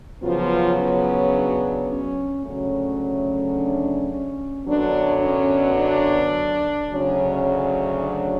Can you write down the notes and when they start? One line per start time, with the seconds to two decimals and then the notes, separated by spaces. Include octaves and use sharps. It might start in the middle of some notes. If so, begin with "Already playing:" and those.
0.22 C#3 F3 F#3 B3 F4
0.78 C#4
1.33 D4
1.89 C#4
2.44 D2 C#3 F#3 A3 C#4
3.55 D4
4.10 C#4
4.66 F#2 D3 F#3 B3 D4
5.22 C#4
5.78 D4
6.89 D2 C#3 F#3 C#4
7.45 C#4
8.00 D4